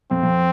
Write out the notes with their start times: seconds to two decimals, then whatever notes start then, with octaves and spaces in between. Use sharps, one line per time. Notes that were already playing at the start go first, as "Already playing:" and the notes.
0.11 F2 C4
0.23 F2